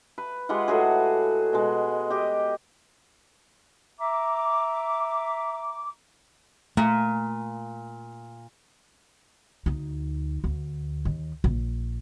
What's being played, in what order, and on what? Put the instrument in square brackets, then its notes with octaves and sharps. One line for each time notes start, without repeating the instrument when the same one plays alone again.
[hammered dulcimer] B4
G#3 F4 G4 F#5
A2 F#3 F#4 G#4
B2 G#3
G4 D#5
[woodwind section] E5 A#5 D6
[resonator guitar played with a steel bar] A#2 [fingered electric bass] A3
[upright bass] D2 D#4
D2
D#2
A#1